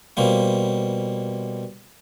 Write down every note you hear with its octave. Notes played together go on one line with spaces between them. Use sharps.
B2 F3 G3 A#3